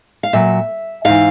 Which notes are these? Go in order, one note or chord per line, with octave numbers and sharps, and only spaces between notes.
F5
A#2 F#3 E5
G#2 E3 F5